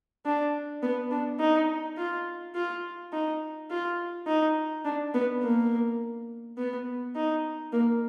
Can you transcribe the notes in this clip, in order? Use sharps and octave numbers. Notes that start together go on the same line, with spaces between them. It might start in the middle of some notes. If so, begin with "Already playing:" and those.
D4
B3
D4
D#4
F4
F4
D#4
F4
D#4
D4
B3
A#3
B3
D#4
A#3